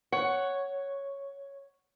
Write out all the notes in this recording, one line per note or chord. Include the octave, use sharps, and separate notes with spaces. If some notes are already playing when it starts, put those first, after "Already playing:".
C#5 F#5